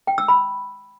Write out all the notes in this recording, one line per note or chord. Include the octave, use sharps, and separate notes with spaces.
G5
E6
B5